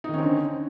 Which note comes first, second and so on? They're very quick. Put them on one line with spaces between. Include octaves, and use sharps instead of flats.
D#4 D#3 C#4 C4 D3